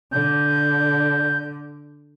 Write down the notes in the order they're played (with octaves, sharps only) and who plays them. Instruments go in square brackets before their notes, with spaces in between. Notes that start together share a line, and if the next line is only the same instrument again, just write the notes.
[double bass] D3 [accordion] G6